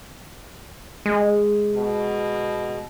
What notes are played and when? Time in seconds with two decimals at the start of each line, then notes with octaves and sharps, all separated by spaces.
1.06 G#3
1.75 B2